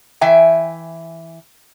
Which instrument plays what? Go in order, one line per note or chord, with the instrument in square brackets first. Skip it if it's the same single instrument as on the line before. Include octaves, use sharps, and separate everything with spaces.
[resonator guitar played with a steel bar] E3 E5 G5 G#5